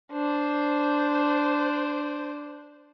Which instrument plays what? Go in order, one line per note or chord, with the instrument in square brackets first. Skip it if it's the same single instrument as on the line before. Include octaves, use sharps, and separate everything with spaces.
[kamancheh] D4 C5